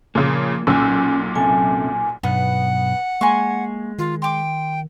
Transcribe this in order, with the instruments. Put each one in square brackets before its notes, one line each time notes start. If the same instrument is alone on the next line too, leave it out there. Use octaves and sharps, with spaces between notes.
[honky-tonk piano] A#2 C#3 [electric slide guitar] F3 A#3
[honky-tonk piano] B1 A#2 E6 [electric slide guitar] C#4 F#5 G#5
[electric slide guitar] F#2 C3 A4 [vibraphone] G#5
[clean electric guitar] B1 [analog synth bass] G2 [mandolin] B3 [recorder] F#5
[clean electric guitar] G#3 [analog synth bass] A#3 [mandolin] G#5 C6 C#6
[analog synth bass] D#3 [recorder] F4
[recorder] G5 [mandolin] C6 D6